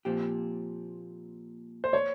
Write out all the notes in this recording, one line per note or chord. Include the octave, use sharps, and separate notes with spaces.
A#2 F3 C4 G4
C5
C#5